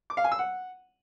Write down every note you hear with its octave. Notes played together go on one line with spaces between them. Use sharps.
D6
F5
G#5
E6
F#5